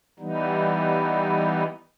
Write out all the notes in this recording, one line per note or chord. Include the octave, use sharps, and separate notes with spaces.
E3 G3 B3 D#4